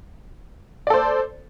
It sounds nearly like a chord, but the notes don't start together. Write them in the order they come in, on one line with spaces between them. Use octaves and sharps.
D5 A4 C5